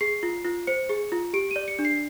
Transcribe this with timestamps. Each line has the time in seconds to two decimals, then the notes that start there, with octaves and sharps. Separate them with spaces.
0.01 G#4 C7
0.23 F4
0.45 F4
0.67 C5 C#7
0.89 G#4
1.12 F4
1.33 G4 D7
1.51 D5 D#7
1.68 C#7
1.79 D4
1.85 C7